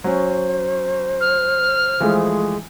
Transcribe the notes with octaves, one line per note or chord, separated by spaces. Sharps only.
F#3 C#4 C5
F6
E3 F3 G#3 A3